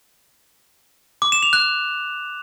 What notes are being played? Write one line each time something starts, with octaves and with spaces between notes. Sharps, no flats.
D6
E7
F7
F#6